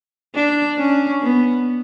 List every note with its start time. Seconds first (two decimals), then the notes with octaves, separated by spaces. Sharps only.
0.35 D4
0.79 C#4
1.22 B3